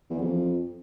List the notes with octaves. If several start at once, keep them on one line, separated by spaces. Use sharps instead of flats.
E2
F2